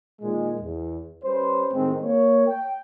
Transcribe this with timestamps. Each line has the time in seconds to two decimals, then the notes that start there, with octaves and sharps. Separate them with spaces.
0.21 A#2 D#3 G#3
0.61 E2
1.24 G3 C#4 B4 C5
1.73 A2 D#3 G#3 C4
2.02 A#3 C#5
2.47 G5